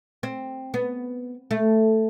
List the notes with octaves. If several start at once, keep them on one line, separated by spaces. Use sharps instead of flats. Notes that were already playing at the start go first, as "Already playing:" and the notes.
C4
B3
A3